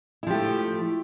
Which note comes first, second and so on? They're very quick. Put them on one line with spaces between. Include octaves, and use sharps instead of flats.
E4 F3 G4 A3